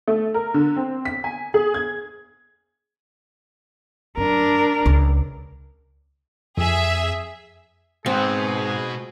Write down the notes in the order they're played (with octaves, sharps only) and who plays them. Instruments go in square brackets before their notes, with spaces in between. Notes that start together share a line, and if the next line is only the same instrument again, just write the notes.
[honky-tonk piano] A3
A#4
D3
C4
B6
G#5
G#4
G#6
[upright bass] F#2 [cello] D4 A#4
[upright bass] C#2
[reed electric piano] F2 [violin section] G#4 E5 E6
[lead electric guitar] G#2 [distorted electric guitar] B2 F#4 [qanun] C4 [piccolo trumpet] G#4